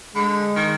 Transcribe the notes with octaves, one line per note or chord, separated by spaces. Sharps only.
D3 G#3
D#3